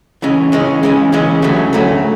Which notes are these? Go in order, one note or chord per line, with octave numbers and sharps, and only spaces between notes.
C#3 E3 G#3 C#4
C#3 E3 G#3 C#4
C#3 E3 G#3 C#4
C#3 E3 G#3 C#4
D2 C#3 F#3 A3 C#4
D2 C#3 F#3 A3 C#4